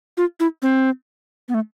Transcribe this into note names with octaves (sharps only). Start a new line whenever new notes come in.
F4
E4
C4
B3
A3